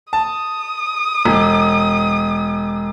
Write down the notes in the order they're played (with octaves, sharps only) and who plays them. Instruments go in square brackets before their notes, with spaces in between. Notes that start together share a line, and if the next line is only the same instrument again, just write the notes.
[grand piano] A5 [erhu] D#6
[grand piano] E1